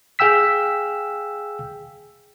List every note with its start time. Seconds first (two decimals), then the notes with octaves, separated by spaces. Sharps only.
0.19 G#4 F5 G5 E6 B6